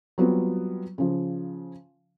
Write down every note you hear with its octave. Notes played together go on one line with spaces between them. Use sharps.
F#3 G3 B3 C4 F4
C#3 F3